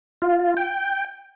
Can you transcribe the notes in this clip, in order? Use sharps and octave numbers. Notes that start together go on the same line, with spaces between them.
F4
G5